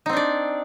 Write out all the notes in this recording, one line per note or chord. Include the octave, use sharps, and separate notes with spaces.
C4 D4 D#4 D5